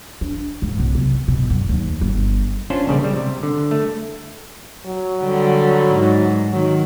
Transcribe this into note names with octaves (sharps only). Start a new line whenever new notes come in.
D4
G#2
B1
C3
B2
F#2
D#2
G1
C#4 D4 F4 C5
A#1 C#3 G3 D5
G3
C3
D3
A3
F#3
D3 G3
G#2
D#3 F#3